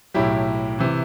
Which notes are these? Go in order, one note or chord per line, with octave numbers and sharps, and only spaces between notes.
B1 A2 F#3 E4 G4
C3 E3